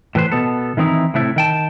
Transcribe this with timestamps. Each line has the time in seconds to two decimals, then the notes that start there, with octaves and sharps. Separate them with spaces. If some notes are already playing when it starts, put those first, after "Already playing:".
0.15 A2 E3 B4 C5
0.32 B2 B3 A4
0.77 D#3 E3 C4 D#4 E4
1.14 A2 C3 A3 E4
1.36 D#3 G5 A5